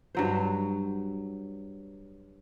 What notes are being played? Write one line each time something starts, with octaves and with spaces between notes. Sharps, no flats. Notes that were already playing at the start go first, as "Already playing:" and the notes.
G2 F#3 C5